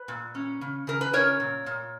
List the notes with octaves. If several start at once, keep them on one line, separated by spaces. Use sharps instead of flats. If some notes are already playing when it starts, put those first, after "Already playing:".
Already playing: B4
A#2
C#4
C#3
C#3 A#4
B4
C#4 A#4 C#5
A#2
A#2